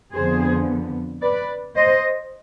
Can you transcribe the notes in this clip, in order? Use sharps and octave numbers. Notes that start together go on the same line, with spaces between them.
F2 D3 F3 B3 G#4 C5
B4 D5
C5 D#5